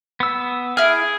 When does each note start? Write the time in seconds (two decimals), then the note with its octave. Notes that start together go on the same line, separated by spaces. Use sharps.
0.20 B3 E6
0.77 E4 G#4 F6